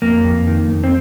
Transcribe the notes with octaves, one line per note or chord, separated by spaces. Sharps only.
F2 A#3
F2
D#3
F2
C4